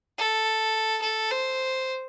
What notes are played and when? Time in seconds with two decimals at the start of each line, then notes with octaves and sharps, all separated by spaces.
0.18 A4
1.02 A4
1.31 C5